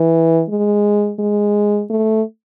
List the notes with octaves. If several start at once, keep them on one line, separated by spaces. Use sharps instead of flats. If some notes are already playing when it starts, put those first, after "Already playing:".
Already playing: E3
G#3
G#3
A3